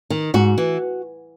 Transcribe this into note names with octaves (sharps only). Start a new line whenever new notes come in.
D#3
G#2 F#4
E3